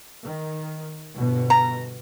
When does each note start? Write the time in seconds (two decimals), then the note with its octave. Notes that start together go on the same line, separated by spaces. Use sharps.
0.24 D#3
1.16 G1 B2
1.50 A#5